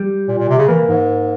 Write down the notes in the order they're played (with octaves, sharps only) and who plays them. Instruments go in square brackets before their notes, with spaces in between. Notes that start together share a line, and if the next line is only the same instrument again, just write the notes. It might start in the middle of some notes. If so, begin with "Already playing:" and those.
Already playing: [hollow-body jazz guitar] G3
[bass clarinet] A#2
A#2
C3
C#3
[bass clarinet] E3 [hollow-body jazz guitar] A#3
[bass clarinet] G#2